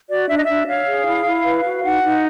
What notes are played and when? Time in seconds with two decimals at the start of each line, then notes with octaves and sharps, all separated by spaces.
0.10 F#4 D5
0.29 D4 E5
0.36 D#5
0.44 D4 E5
0.67 C#5 F5
0.87 G#4
1.07 E4
1.26 E4
1.45 B4
1.64 F#4
1.84 D#4 F#5
2.03 D#4